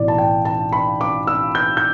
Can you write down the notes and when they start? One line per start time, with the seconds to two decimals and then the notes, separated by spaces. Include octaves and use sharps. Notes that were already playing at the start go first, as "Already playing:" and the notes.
Already playing: B1 A2 E3 D5
0.08 A5
0.18 G5
0.45 A5
0.73 B5
1.01 D6
1.27 E6
1.55 G6
1.77 G6